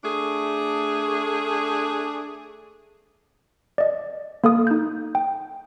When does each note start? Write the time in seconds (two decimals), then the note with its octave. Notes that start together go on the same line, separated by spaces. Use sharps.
0.04 A3 D4 G#4
3.78 D5 D#5
4.44 A#3 A4 F5 D#6
4.67 D#4 G6
5.15 G5